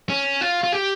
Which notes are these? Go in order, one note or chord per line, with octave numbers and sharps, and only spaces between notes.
C#4
F4
F4
G4